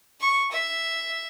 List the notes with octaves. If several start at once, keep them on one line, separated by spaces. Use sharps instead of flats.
C#6
E5